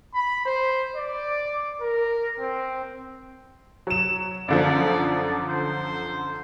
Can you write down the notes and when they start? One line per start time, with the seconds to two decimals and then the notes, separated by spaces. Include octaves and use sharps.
0.14 B5
0.46 C5
0.96 D5
1.81 A#4
2.40 C4
3.87 F#3 E7
4.48 F#2 D3 F3 D5
5.49 C5